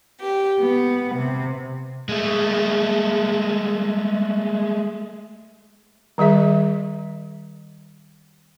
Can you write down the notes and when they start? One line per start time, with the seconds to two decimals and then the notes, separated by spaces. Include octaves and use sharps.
0.19 G4
0.61 B3
1.15 C3
2.09 G#3 A3
6.18 D#3 G3 G#4 E5